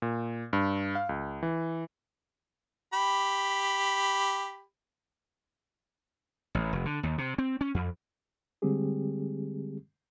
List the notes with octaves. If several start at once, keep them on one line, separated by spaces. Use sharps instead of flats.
A#2
G2
F5
C#2
E3
G4 B5
A1
F1
D3
D#2
C3
C4
C#4
F2
D3 G3 G#3 C4 G4 G#4